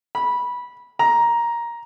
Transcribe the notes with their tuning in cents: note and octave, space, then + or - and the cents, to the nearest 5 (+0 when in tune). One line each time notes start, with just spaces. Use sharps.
B5 -15
A#5 +10